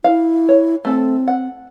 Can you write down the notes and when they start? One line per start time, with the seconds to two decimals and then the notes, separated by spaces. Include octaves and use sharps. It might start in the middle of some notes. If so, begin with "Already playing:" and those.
0.04 E4 F5
0.49 C#5
0.85 A3 C4 A4 A5
1.28 F#5